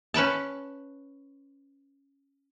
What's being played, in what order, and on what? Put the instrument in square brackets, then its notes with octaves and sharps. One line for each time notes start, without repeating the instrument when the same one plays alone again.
[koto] C#4 B4 G5 A5